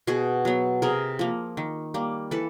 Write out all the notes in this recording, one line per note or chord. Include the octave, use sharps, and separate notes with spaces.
B2 F#4 G#4
F#3 B3
C3 G#4 A#4
F3 A#3
D#3
G3 A#3
E3 A4 B4